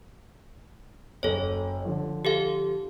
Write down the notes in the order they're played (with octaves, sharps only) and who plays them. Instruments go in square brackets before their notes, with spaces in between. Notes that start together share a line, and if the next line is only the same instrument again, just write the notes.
[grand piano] F#1 [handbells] A4 C#5
[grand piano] D3 F3
[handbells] G4 A4 F5